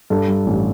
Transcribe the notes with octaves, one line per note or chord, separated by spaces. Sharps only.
G2 A4
G3
A1